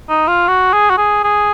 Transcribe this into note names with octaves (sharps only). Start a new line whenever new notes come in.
D#4
F4
F#4
G#4
F#4
G#4
G#4